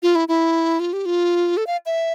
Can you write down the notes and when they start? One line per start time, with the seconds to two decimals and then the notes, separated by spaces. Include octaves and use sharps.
0.03 F4
0.15 E4
0.28 E4
0.80 F4
0.93 G4
1.06 F4
1.57 A4
1.67 F5
1.86 E5